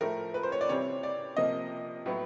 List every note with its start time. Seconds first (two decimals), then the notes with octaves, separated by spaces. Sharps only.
0.01 A2 F3 A3 A#4
0.34 B4
0.43 C5
0.52 C#5
0.61 D5
0.69 C3 E3 G3 C4 C#5
1.03 D5
1.37 C3 F3 A#3 D#5
2.06 A2 F#3 B3